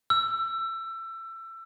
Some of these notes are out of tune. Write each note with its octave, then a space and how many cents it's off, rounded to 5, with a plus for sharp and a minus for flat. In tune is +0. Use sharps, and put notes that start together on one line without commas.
E6 +25